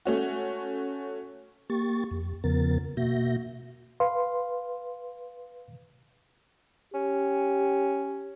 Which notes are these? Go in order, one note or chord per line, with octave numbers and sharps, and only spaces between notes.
A3 C#4 F#4
A#3 G4 C#6 A6
F2
E2 C#3 F3 B3 A#4 A6
B2 A#3 F#4 E5 G6 A#6
B4 F5 C6
C#4 G4